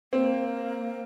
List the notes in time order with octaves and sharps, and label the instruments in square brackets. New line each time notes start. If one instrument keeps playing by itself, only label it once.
[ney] A#3 [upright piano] C4